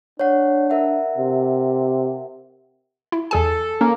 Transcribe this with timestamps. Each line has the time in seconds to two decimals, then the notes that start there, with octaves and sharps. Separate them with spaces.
0.19 D4 C#5 F#5
0.70 A#4 E5 F#5
1.17 C3
3.12 E4
3.31 E2 G#4 A4 G#5
3.81 A#3 C#4